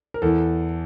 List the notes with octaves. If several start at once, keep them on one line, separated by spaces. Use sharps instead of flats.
A#4
E2 E3 A4